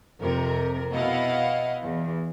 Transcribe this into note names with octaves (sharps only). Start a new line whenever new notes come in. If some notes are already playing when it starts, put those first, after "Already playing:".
F2 C3 A#4
B2 E4 D#5 F5 F#5
E2